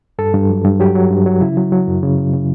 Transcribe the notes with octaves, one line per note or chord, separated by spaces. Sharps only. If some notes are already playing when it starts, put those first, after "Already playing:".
G2 A4
G2
F#3
G2
F#3 G4
F#3
G2
F#3
C#3 E4
F#3
F#3
F#2
C#3
C#3
C#3